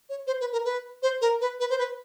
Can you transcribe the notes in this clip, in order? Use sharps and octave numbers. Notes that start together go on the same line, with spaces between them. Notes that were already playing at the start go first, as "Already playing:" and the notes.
C#5
C5
B4
A#4
B4
C5
A#4
B4
B4
C5
B4